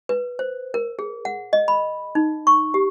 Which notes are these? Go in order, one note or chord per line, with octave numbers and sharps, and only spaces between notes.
B4
C5
A#4
G#4
F#5
D#5
B5
D#4
C#6
G4